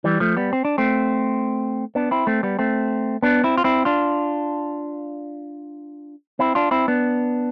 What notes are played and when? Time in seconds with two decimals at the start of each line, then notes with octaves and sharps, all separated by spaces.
0.04 E3 G3
0.20 F3 A3
0.37 G3 B3
0.53 C4
0.65 D4
0.78 A3 C4
1.95 B3 D4
2.11 C4 E4
2.27 A3 C4
2.43 G3 B3
2.59 A3 C4
3.23 B3 D4
3.44 C4 E4
3.58 F4
3.64 C4 E4
3.85 D4 F4
6.39 C4 E4
6.55 D4 F4
6.71 C4 E4
6.88 B3 D4